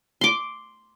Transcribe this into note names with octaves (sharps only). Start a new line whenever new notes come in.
C6 D6